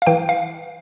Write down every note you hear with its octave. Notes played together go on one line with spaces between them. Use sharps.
F5
E3 G5
F5